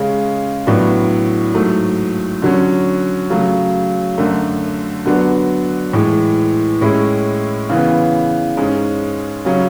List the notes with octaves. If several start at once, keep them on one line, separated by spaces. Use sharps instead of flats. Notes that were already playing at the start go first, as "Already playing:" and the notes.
Already playing: C#3 G#3 C#4
A2 F#3 B3 D4
G#2 F#3 A3
D3 F#3 C#4
C#3 F#3 A3
F#2 D3 A3
D3 F#3 B3 D4
A2 E3 G#3
A2 G#3 C#4 E4
C#3 E3 B3
G#2 G#3 C#4
C#3 F#3 C#4